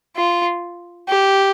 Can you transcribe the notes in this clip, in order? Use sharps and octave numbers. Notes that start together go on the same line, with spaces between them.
F4
G4